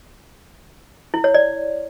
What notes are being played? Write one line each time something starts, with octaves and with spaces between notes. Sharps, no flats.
E4
C#5
D5